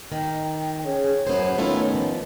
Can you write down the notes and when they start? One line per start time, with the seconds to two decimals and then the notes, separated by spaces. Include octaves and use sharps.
0.12 D#3 G5
0.85 C#4 G#4 C#5
1.27 F#2 B3 C5
1.58 D#3 A3 B3 C#4 E4 F4
1.92 A2 F3